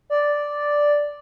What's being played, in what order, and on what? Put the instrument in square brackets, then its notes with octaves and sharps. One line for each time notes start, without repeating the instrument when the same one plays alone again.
[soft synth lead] D5